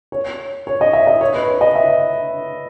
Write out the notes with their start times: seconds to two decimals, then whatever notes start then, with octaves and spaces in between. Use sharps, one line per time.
0.12 C#5
0.67 C#5
0.81 D#5
0.93 E5
1.07 D#5
1.21 C#5
1.34 B4
1.48 C#5
1.61 D#5
1.75 E5